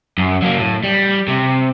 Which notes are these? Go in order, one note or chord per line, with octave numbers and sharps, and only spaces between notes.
F#2
F#3 A#3
A2
G3
C3